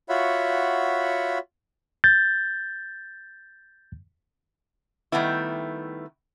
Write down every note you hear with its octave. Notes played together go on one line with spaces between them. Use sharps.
F4 F#4 C#5 E5 F#5 B5
G6 A6
D#3 E3 G3 A3 B3 E4